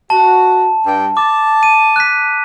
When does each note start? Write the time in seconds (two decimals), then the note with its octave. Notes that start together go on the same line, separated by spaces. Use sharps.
0.10 F#4 A5
0.84 G2 G5
1.17 A5 D6
1.63 D#7
1.96 F#6 B6